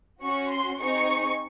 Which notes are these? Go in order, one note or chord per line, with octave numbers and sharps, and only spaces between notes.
C#4 F#4 C#6
C6
C4 D#4 G#4 C#6